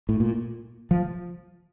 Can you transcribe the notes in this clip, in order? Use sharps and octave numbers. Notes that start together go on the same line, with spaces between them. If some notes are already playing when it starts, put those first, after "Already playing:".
A2
A#2
F3